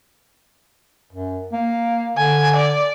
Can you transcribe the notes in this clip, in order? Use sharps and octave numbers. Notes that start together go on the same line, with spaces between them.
F#2
A#3
D3 G#5
D5